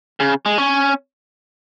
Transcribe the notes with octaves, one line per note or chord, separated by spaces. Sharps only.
C#3
G#3
C#4